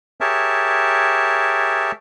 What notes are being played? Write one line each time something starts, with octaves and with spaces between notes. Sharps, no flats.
G4 G#4 A#4 C#5 E5 A5